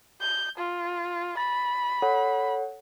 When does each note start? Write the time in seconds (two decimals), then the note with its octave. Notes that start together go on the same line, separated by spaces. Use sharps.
0.21 G6
0.57 F4
1.37 B5 A6
2.02 A4 C#5 F#5